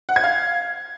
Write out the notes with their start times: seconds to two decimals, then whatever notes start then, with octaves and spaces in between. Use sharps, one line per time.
0.09 F#5
0.16 G#6
0.24 F5